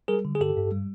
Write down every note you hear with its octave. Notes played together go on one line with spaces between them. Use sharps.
G3 G#4 A#4
D3
G#4
G2 G4 A4
G2
G3